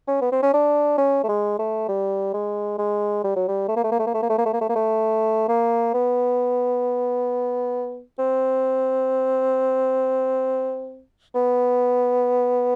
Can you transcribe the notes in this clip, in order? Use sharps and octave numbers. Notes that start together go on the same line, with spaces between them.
C#4
B3
C4
C#4
D4
C#4
A3
G#3
A3
G3
G#3
G#3
G3
F#3
G3
A3
A#3
A3
A#3
A3
A#3
A3
A#3
A3
A#3
A3
A#3
A3
A#3
A3
A#3
B3
C4
B3